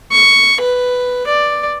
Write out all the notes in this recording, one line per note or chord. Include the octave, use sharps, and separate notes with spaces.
C#6
B4
D5